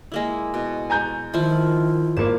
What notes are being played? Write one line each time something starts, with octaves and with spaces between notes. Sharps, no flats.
G#3 A#3 E4
B2
G#5 A#5 G6
D#3 F3 E4 F4
G#1 A#3 A5